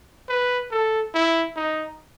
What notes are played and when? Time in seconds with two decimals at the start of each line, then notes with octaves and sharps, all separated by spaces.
0.29 B4
0.71 A4
1.14 E4
1.56 D#4